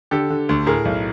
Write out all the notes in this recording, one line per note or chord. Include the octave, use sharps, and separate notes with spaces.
D3 G4 A4
D3
D2
A2 G#4 A#4
B1